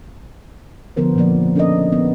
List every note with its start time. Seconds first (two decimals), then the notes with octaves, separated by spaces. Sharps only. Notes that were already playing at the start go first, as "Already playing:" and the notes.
0.96 D3 F3 B3 A#4 C5
1.16 A#2 C#3 F3 A#3 D5
1.56 C#4 D4 A4 A#4 D5 D#5
1.92 B3